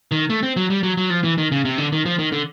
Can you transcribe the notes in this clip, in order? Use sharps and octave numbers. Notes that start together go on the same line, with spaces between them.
D#3
A3
C4
F#3
G3
F#3
F#3
F3
E3
D#3
C#3
C3
D3
D#3
F3
D#3
D3